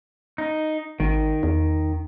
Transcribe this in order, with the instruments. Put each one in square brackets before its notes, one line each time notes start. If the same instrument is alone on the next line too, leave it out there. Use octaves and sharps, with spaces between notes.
[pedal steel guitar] D#4
[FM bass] G#1 [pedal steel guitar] D#3
[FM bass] E2